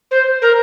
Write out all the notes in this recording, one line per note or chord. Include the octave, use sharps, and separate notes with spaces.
C5
A#4